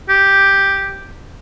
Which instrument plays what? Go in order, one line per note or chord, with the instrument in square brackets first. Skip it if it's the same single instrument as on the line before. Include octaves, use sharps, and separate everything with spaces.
[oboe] G4